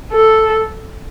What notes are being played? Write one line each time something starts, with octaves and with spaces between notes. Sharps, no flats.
A4